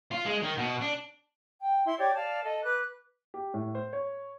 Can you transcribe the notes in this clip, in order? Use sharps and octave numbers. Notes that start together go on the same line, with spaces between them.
F4
G#3
D#3
B2
D4
G5
E4 E5 C6
G4 C#5 D5
D5 F5 A5
A4 D#5
B4 D6 F#6
G4
A2
C5
C#5